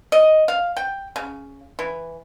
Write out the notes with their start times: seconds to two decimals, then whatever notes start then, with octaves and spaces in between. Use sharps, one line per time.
0.12 D#5
0.48 F5
0.77 G5
1.16 C#3
1.79 E3